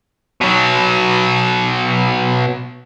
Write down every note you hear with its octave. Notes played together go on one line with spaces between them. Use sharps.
B2 F#3